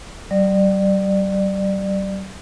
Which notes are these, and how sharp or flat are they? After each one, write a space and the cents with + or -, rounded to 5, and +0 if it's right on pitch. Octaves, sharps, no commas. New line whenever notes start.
G3 -40 D5 +25